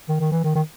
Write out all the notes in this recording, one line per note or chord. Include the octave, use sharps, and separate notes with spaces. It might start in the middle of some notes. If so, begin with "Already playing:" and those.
D#3
D#3
E3
D#3
D#3